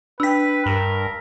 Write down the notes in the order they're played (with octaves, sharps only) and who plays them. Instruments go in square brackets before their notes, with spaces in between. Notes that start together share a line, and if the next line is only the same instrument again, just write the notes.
[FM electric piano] D4 G5 [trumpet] B4 [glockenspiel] E6 B6
[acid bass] G2 [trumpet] A#4